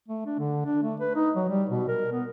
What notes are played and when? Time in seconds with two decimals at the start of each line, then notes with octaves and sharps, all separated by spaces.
0.08 A3
0.26 D4
0.39 D3
0.65 D4
0.83 A3
1.00 B4
1.16 D#4
1.36 F#3
1.49 G3
1.70 B2
1.88 A#4
2.12 B3